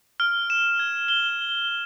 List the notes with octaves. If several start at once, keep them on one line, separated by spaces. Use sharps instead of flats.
F6
E7
G#6
G7